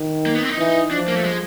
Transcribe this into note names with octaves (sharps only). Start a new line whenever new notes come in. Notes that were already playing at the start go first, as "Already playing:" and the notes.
Already playing: D#3
A#3
B3
C4
D#4
E3
F3 D4
A#3
A3
G#3